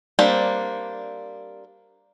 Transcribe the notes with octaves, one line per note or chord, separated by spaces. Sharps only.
G3 A#3 C4 D4